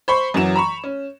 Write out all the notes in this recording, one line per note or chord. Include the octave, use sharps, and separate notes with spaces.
C5 B5 C#6
F#2 E3 F#3 E7
A#5 B5 C#6
C#4